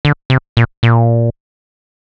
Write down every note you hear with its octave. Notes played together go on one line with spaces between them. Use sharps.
D3
C3
A#2
A#2